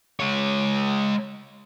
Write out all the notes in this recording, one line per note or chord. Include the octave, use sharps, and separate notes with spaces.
G#3 C#5